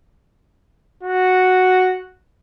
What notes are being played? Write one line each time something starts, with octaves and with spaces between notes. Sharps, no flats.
F#4